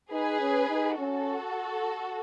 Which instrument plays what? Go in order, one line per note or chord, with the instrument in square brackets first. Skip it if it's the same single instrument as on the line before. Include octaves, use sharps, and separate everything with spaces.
[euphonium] D#4 [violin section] G#4 B4
[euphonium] C#4
D#4
[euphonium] C#4 [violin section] F#4 A4